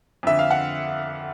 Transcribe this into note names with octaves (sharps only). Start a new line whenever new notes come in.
F2 D3 E5
F5
F#5